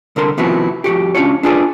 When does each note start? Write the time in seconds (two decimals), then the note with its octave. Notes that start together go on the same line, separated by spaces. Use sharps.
0.16 C2 D3 A#4 C6
0.37 D#2 C3 F3 B3 E4 F#4
0.84 F2 G#2 F#4 G4
1.15 C#2 C#4 D4 F4 C#5
1.43 D4 F4 G#4 B4 C5 D5